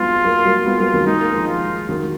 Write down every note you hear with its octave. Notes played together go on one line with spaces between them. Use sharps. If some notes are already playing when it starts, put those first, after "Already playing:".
Already playing: F#3 G#3 B3 F4
F#3 A#3
F#3 A#3
G#3 B3 F4
F#3 A#3
D#3 F#3
G#3 D#4
A#3
F3 G#3
F4
D#3 F#3